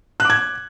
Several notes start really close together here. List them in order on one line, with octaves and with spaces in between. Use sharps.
F#6 D6 G#6